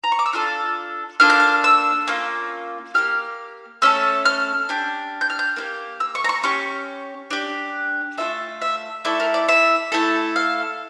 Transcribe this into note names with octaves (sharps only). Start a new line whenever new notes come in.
A#5
C#6
D6
E6
D4 F4 A4 F6
A#3 D4 F4 A4 F6
G6
F6
E6
A#3 C#4 F4
A#3 E4 G4 F6
A3 C#4 A4 E6
F6
D4 G4
G6
F6
G6
A#3 D4 G4
E6
C#6
A#5
C#6
C#4 G4 C#6
D4 G4
A3 C#4 F4 A4 E5
E5
A3 E4 A4 D5
A#4
D5
E5
A3 E4 A4
F5